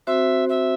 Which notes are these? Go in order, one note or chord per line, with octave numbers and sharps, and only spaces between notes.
C4 F#4 C5 E5
E5